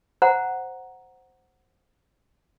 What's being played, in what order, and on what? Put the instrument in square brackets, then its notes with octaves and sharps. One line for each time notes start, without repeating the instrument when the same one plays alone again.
[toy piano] C5 F#5 A#5